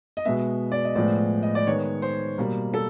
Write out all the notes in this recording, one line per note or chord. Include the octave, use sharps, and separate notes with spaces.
D#5
B2 G#3 B3 E5
D5
D#5
A2 F3 G#3 B3 D5
D#5
D5
D#3 G#3 B3 C#5
C5
B2 G3 A#3
A4